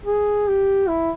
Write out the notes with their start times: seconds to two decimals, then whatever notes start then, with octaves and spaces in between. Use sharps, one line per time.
0.06 G#4
0.48 G4
0.89 E4